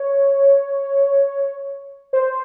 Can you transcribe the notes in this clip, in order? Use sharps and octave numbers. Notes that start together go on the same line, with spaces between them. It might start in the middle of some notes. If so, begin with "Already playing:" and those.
Already playing: C#5
C5